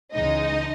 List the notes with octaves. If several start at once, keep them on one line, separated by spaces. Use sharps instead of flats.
C#2 C#3 E3 G#3 D#4 D#5